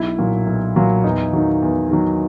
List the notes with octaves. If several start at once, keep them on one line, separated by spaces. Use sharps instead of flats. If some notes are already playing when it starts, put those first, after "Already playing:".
Already playing: B1 E4
A#2 F#3
B1
A#2 F#3
E2 D#4
D#3 F#3
E2
D#3 F#3